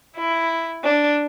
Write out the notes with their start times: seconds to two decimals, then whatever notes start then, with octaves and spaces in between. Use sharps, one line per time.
0.15 E4
0.83 D4